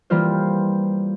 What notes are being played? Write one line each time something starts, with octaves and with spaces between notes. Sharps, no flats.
E3 G3 A#3 F4 C5